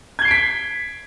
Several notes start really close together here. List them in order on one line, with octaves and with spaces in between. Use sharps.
G#6 G7 C7 D7 B6